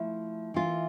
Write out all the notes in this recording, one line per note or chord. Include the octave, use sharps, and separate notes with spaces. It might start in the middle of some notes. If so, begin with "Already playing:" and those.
Already playing: F3 A3 E4
E3 A#3 F4